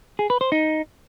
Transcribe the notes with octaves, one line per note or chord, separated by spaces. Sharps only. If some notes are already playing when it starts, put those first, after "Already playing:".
G#4
B4
C5
D#4